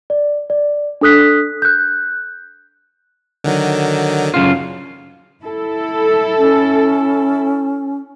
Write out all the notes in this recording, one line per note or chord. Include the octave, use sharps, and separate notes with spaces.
D5
D5
D4 A4 D#6 F#6 B6
F#6 G6
D3 D#3 F#3
F#2 C#3 F4
E4 A4
C#4